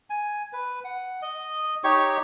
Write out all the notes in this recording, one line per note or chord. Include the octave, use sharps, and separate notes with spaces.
G#5
B4
F#5
D#5
D#4 G4 C#5 C#6